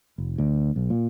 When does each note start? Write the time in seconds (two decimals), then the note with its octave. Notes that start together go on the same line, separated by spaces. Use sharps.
0.18 F1
0.38 D2
0.76 B1
0.90 A#2